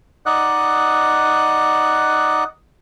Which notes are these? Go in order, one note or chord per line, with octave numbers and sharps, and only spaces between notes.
D#4 D5 D#5 F#5 F#6